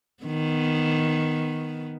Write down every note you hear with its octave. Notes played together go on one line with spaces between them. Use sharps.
D#3 B3